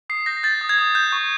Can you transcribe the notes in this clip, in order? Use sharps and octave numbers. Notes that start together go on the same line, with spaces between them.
D#6 C7
G6 A#6
G6 A6
D#6
G#6
D#6
G6
C#6